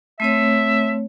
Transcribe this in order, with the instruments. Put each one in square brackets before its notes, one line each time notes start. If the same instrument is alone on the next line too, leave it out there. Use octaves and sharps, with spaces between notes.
[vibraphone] A3 C4 C#5 [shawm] E5